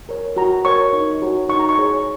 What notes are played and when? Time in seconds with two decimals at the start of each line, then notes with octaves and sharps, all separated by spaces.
0.09 A#4 C#5
0.37 F#4 A#5
0.65 A#4 C#5 C#6
0.93 D#4
1.22 F#4 C#5
1.49 D#4 C#6
1.60 A#5
1.69 C#6
1.78 G#4 C#5